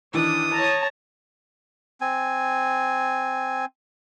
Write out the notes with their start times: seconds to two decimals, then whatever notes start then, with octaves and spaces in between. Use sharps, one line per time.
0.14 D#3 E3 D4 D#6
0.53 C#5 A5 A#5
2.01 C4 G#5